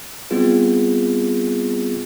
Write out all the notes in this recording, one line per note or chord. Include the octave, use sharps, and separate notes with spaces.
G3 B3 C4 F4 G#4